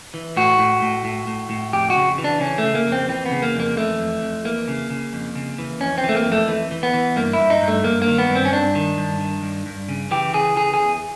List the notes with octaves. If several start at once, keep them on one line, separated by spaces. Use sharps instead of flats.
E3
A2 F#4
A2
A2
A2
A2
A2
F2 G4
F#4
C#3
E3
D4
C#3 C#4
C#3 A3
A#3
F2
C4
E3 C4
B3
C#3
A#3
F2
A#3
E3 A3
F2
F2
E3 A#3
C#3
C#3
F2
C#3
E3
F2 C#4
C4
E3
A3
A#3
F2
A3
E3
E3
B3
E3
G2 A#3
E4
G2
D#4
G2
A3
G2 A#3
A#3
D#3
B3
G2
C4
C#4
G2 D4
D#3
G2
D#3
G2
G2
C#3
E3 G4
C#3 G#4
E3 G#4
G#4
E2